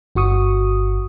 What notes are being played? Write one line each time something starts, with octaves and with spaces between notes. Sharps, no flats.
G1 F#4 C#6 D#6